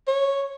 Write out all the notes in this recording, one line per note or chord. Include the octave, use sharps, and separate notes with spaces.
C#5